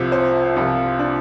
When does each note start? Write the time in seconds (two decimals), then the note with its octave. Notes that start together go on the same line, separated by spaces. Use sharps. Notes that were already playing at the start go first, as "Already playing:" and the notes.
Already playing: C2 C3 F3 C5
0.12 C5
0.56 C2 C3 F3 F4
0.99 D4